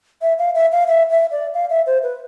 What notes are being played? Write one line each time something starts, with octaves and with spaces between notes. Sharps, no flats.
E5
F5
E5
F5
E5
E5
D5
F5
E5
C5
B4